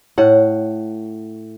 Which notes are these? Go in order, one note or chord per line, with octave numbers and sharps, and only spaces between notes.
A2 F#5